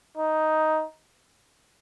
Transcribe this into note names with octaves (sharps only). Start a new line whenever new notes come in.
D#4